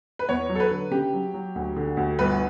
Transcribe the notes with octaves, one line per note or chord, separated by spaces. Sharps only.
B4
E2 C#5
F#3
A4
B4
D3
C#3 G4
F#3
F#3
D2
D3
D2
G1 B4